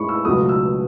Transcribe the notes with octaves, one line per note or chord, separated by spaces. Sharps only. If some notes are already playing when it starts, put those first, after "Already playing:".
Already playing: A2 G#3 B5 C#6
E6
C#2 B2 F#3 A3 D#6
E6